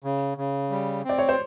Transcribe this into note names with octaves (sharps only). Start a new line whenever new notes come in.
C#3
C#3
G3
C4 D5
C#5
C5